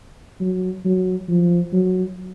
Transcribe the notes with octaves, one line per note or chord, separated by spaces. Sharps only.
F#3
F#3
F3
F#3